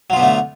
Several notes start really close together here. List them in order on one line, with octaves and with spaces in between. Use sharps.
F#3 F4 B3 D3 A3